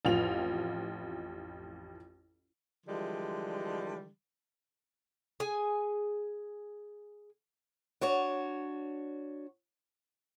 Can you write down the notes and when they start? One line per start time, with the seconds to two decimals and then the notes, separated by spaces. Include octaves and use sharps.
0.05 A1 F2 F4 F7
2.86 D3 E3 F3 G3 G#3
5.40 G#4 G#5
8.01 D4 F#4 C#5